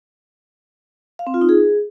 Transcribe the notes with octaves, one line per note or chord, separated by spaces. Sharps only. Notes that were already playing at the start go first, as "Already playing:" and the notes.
F5
C4
F4
D#4
G#4